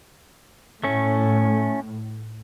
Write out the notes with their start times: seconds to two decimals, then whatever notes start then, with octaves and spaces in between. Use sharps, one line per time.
0.84 A2 A3 C#4